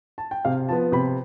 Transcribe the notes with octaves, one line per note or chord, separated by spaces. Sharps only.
A5
G5
C3 F5
F3 B3 A5
C3 B5